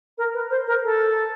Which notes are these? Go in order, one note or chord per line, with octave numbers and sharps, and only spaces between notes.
A#4
B4
C5
A#4
A4